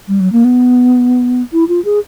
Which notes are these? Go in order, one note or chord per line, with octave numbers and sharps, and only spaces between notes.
G3
F#3
A#3
B3
E4
F4
G#4